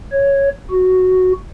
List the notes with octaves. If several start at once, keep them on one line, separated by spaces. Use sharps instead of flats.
C#5
F#4